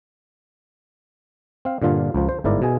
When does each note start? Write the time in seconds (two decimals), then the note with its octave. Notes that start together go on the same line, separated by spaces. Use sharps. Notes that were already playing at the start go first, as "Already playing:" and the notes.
1.65 C4 F5
1.82 G2 A#2 D3 F4
2.14 C#2 F3
2.29 C5
2.44 G1 G#2 E4 A#4 D5
2.62 B2 G#4 G#5